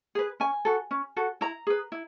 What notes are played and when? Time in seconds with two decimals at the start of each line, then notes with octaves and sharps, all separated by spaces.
0.15 G#4 B4
0.40 C#4 G#5
0.65 F#4 A4
0.91 C#4
1.16 F#4 A4
1.41 E4 A#5
1.67 G#4 B4
1.92 E4